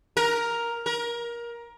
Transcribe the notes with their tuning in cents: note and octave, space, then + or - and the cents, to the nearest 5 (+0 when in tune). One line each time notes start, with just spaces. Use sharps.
A#4 +5
A#4 +20